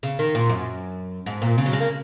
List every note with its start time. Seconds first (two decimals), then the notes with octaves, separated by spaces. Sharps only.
0.03 C#3
0.19 D#3
0.35 A#2
0.49 F#2
1.26 G#2
1.42 A#2
1.58 C#3
1.66 F#3
1.73 G#3
1.80 A#3